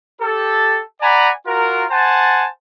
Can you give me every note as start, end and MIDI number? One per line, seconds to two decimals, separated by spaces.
0.21 0.81 67
0.21 0.81 69
1.01 1.31 74
1.01 1.31 78
1.01 1.31 80
1.01 1.31 82
1.01 1.31 83
1.46 1.84 65
1.46 1.84 66
1.46 1.84 70
1.90 2.47 72
1.90 2.47 78
1.90 2.47 80
1.90 2.47 81